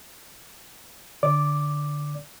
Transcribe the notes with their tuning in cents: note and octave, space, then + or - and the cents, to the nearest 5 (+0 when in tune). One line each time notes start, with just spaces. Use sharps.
D3 +0 D5 -20 D6 +0